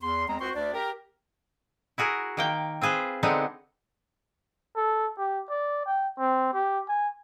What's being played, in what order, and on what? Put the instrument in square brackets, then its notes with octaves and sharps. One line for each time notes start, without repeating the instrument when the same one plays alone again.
[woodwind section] E2 C6
E2 G#3 C4 A#5
C#2 C4 F#4 C5 C6 C#6
D2 D4 D5
G4 A#4
[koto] E4 F#4 G#4 A#4
D#3 A#3 G5
C4 F4 G#4 B4 C5
D3 G#3 B3 C4 D4 D#4
[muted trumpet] A4
G4
D5
G5
C4
G4
G#5